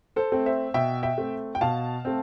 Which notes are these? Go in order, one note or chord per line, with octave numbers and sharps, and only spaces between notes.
A4 C5
A3 C4
C5 E5
B2 E5 G5
E5 G5
A3 C4
G5
B2 F5 A5
A3 C4